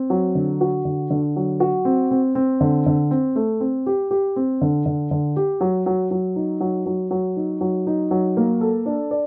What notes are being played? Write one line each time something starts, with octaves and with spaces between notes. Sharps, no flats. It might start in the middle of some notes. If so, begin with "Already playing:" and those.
Already playing: C4
F#3
D3
F#4
D3
D3
F#3
F#4
C4
C4
C4
D3
D3
C4
A3
C4
G4
G4
C4
D3
D3
D3
G4
F#3
F#3
F#3
D#4
F#3
F#3
F#3
D#4
F#3
D#4
F#3
A#3
A4
D4
D5